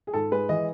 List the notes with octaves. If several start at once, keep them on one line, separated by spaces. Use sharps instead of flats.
G#4
G#2 A4
G#3 B4
E3 D#5